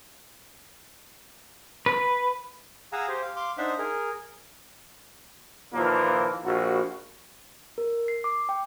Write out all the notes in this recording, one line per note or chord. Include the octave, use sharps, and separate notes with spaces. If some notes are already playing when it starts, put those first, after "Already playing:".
B4
G#4 F5 F#5 G#5 A#5 E6
G4 C5
F5
F5 C6 D6
D4 D#4 C5 E5 F#5
G#4 A#4
D#2 A#2 E3 F3 A#3
A#1 F#4
A#4
C7
D6
G5